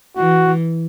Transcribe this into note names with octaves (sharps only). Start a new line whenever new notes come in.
E3 F#4